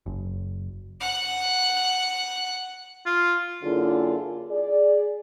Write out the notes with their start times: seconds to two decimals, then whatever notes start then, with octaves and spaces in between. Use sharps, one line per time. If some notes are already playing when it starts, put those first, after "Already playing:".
0.06 F#1
1.00 F#5 F#6
3.06 F4
3.63 F#2 D3 A#3 E4 F4 G#4
4.50 G#4 D5